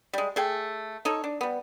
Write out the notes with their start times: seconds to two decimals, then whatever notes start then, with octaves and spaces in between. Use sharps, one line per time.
0.13 G3 G#3
0.36 A3 G#4 G5
1.05 D#4 A4 C#5
1.24 D4
1.41 G3 B3